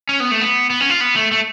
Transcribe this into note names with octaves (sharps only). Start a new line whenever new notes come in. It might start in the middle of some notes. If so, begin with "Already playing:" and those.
C#4
B3
A3
B3
B3
C#4
F4
B3
A3
A3